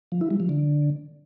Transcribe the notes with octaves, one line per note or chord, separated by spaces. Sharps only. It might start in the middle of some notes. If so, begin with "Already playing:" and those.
F3
E4
G3
F3
D3